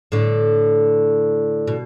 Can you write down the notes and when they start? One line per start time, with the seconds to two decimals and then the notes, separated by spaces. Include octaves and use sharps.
0.12 A2 D3
1.67 B2